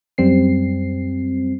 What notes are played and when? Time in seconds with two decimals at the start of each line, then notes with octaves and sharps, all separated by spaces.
0.18 F#2 G3 C4 C7